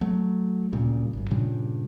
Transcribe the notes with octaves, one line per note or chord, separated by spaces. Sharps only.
F#3 A3
D1 A#2 C#3 G3
G#1 F#2
G2 A#2 C#3 G3